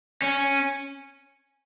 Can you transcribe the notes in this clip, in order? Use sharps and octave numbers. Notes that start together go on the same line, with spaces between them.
C#4